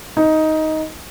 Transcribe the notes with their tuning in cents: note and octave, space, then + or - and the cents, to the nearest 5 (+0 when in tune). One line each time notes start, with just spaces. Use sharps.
D#4 +10